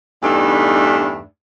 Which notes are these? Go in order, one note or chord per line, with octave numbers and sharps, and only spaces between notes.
E2 G2 G3 A3 D4 D#4